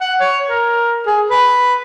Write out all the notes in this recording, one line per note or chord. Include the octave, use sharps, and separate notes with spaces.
F#5
C#5
A#4
G#4
B4